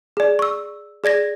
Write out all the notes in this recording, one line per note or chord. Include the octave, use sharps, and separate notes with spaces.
G#4 D5
C#6 E6
G#4 D5 G#6 A#6